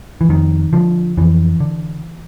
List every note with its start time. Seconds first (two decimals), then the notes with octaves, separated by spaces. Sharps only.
0.21 E3
0.29 F2 D#3
0.73 D3 F3
1.17 F2 E3
1.60 D3